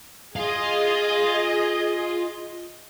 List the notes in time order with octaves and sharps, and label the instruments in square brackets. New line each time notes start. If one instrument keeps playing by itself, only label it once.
[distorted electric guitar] F4 F5 [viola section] G#4 D#5